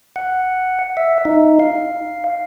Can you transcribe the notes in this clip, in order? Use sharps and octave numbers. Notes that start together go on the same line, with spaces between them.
F#5
E5
D#4
F5